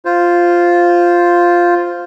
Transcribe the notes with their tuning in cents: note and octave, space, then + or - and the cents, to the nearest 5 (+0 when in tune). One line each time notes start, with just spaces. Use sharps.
F4 +0 C5 +0